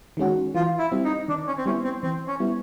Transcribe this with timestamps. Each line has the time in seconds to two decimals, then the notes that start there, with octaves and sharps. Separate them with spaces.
0.17 D#3 G#3 C#4 F#4
0.54 E3 F4
0.79 E4
0.92 G3 C4 E4
1.04 D#4
1.28 D#3 D4
1.47 C#4
1.58 C4
1.66 G3 B3 C#4 E4
1.84 C4
2.03 E3 C4
2.28 C#4
2.40 G3 B3 E4